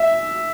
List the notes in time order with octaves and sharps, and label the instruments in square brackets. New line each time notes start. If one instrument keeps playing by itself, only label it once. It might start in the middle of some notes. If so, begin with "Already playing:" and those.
Already playing: [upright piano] E5